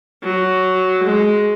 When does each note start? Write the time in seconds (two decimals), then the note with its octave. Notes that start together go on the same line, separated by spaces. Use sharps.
0.23 F#3
1.04 G#3